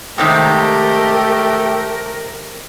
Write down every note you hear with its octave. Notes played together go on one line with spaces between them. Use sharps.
G#2 C3 D#3 A3 G4 A#4